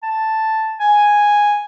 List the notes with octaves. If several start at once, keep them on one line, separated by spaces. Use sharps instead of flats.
A5
G#5